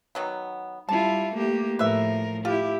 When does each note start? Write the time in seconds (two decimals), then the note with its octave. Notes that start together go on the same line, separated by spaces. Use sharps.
0.15 D#3 F#3 B3
0.89 G3 E4 F4 A5
1.34 A3 A#3 G4
1.79 A2 F3 A#4 B4 E5
2.45 E4 F4 G4